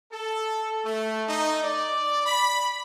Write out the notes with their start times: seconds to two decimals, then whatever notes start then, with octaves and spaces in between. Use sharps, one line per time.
0.12 A4
0.84 A3
1.28 D#4
1.63 D5
2.26 B5